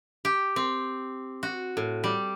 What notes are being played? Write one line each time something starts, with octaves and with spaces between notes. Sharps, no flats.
G4
C4
F#4
A2
G3